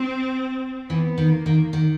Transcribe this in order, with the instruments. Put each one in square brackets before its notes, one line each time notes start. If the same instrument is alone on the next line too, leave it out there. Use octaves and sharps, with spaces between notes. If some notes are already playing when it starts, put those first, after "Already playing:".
Already playing: [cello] C4
[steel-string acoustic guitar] E3 [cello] B3
[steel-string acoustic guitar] D#3
[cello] A#3
[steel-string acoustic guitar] D#3
D#3